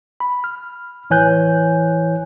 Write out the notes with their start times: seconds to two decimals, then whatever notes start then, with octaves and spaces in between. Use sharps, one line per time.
0.20 B5
0.44 F6
1.10 A1 E3 C#5 G#5 F#6 G6